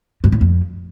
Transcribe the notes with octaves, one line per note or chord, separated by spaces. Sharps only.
G2
A2
F2